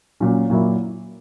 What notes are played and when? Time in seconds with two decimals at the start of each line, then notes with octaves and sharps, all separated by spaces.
0.20 A#2 F#3 C#4
0.50 A#2 F#3 A#3 E4